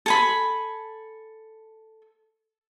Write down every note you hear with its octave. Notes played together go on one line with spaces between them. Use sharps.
A4 G#5 B5